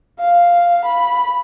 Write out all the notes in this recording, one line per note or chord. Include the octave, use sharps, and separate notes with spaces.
F5
B5